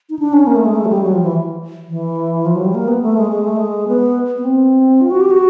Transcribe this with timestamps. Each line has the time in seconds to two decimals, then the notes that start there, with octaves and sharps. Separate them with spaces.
0.10 D#4
0.19 D4
0.33 C#4
0.47 A#3
0.56 A3
0.65 G#3
0.76 A3
0.85 F#3
0.89 G3
1.04 F#3
1.13 F3
1.23 E3
1.90 E3
2.46 F3
2.55 F#3
2.65 G3
2.75 A#3
2.88 B3
3.02 A3
3.17 G#3
3.32 G#3
3.44 A3
3.57 G#3
3.88 B3
4.38 B3
4.44 C4
5.01 F4
5.11 F#4
5.21 G4
5.31 F#4